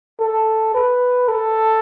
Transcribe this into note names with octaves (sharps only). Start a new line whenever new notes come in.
A4
B4
A4